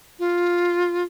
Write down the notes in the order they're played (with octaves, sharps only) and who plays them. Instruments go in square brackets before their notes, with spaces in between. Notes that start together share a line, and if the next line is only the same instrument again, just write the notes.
[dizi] F4